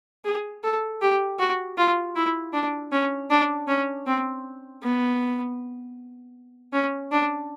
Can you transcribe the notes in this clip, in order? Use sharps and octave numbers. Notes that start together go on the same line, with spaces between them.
G#4
A4
G4
F#4
F4
E4
D4
C#4
D4
C#4
C4
B3
C#4
D4